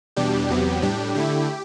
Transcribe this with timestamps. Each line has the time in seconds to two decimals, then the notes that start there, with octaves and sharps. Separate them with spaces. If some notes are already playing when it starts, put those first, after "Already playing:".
0.16 E2 B2 G3 D4 G4
0.49 E2 C3 F#3 B3
0.82 A2 G3 D4 G4
1.15 D3 A3 E4 G4